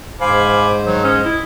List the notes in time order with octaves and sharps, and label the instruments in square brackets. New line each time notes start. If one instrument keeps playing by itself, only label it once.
[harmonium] G#2 C5 [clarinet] F5 [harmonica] G#5 B5 D6
[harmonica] D#3 [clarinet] F#3
[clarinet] C#4 [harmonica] D#5
[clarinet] E4